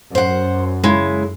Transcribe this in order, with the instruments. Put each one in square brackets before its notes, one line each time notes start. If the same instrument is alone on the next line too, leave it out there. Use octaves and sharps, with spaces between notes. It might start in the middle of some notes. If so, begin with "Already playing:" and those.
[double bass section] F#2 [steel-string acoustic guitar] C5 F#5
[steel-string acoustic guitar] C#3 G#3 E4